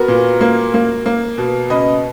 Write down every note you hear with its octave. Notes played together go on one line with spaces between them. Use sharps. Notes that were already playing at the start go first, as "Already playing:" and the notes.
Already playing: B3 F#4 A#4
A#2
A#3
A#3
A#3
B2
C#3 B4 D#5